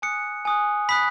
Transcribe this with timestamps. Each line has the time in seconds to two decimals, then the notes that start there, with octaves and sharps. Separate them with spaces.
0.02 G#5 D#6 F#6 C#7
0.45 G#5 D#6 F#6
0.89 B5 D#6 F#6 B6